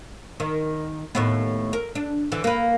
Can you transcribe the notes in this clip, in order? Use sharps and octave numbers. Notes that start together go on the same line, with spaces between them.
D#3
D#2 A2 B3
A#4
D4
D3 E3
A#3 B4